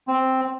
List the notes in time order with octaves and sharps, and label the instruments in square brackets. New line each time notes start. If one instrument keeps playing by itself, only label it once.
[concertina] C4